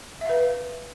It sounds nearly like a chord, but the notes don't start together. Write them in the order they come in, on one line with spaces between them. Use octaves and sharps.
E5 F5 B4